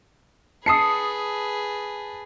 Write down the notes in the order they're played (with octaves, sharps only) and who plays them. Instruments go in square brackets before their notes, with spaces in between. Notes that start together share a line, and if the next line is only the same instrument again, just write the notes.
[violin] G#4 B4 [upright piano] A5 [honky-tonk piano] D#6 C7 C#7